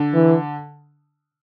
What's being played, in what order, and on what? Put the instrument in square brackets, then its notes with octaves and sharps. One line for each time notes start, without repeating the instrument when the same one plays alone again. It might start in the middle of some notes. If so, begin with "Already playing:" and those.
Already playing: [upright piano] D3
[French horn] E3